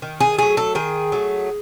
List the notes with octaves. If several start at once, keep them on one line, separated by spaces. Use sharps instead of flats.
D#3
G#4
F#3 A3 G#4
A4
D#3 G#4
F#3 A3